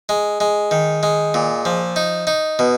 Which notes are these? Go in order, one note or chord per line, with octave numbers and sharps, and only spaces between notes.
G#3
G#3
D#3
G#3
A#2
F3
D#4
D#4
B2